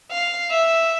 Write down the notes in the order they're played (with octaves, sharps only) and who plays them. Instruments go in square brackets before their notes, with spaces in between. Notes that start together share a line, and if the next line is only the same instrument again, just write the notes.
[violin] F5
E5